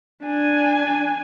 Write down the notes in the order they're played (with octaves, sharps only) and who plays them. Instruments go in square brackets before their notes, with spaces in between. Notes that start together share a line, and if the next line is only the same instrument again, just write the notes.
[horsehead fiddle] D4 G#5